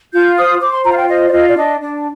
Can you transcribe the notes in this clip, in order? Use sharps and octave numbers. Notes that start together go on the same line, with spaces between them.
F4 G6
C5 D#6
C5 D6
C6
F4 A#5
F5
G5
C5 D#5
D5
F4 D#5
D5
D4 D#5
D4